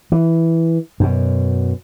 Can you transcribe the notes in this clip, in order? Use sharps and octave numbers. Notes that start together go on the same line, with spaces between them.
E3
F#2 B2